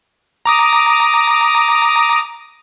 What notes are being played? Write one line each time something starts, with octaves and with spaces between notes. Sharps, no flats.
A#5 D6 D#6